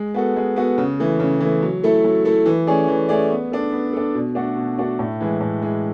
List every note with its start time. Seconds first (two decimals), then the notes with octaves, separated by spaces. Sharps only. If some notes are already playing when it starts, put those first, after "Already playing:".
Already playing: G#3
0.14 B3 F#4 A4
0.36 G#3
0.56 B3 F#4 A4
0.78 C#3
1.00 E3 A3
1.20 C#3
1.40 E3 A3
1.63 F#3
1.84 A3 E4 A4
2.04 F#3
2.25 A3 E4 A4
2.46 E3
2.67 A3 C#4 G#4 D5
2.88 E3
3.09 A3 C#4 G#4 D5
3.30 B3
3.52 D4 A4
3.72 B3
3.93 D4 A4
4.15 B2
4.35 A3 D4 F#4 A4
4.56 B2
4.78 A3 D4 F#4 A4
4.99 A2
5.20 E3 G#3
5.41 A2
5.62 E3 G#3